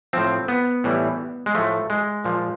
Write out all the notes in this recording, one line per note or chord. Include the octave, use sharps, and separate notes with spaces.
A2 F3 C4
B3
A2 E3 G3
G#3
A2 F3 A3
G#3
A#2 F3